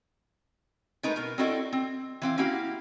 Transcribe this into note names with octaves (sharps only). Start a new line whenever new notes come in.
G#3 A3 D#4 A#4 B4
B2 A#4
C4 D4 E4 F#4 A4 D#5
C4
E3 C4 F5
A#3 C#4 E4 F#4 G4 F5